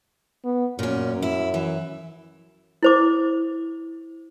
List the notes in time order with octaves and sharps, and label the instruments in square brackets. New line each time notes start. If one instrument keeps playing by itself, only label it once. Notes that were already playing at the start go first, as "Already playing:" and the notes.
[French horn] B3
[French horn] F#2 [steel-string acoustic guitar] A#2 C#4
[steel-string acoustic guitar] E4
E3
[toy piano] E4 C5 D6